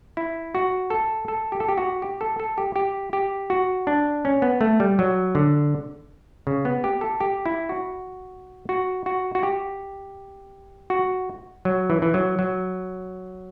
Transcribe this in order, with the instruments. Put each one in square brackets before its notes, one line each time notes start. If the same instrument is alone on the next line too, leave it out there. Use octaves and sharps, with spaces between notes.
[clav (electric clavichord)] E4
F#4
A4
A4
G4
A4
G4
F#4
G4
A4
A4
G4
G4
G4
F#4
D4
C#4
B3
A3
G3
F#3
D3
C#3
B3
G4
A4
G4
E4
F#4
F#4
F#4
F#4
G4
F#4
F#3
E3
E3
F#3
F#3